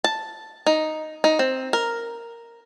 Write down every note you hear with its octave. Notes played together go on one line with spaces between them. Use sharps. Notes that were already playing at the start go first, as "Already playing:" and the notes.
A5
D#4
D#4
C4
A#4